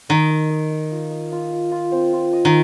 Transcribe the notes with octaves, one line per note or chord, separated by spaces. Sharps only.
D#3 D#5
D#5
D#5
D#5
F4
D#5
F4
D#5
F4
C4
F4
D#5
D#3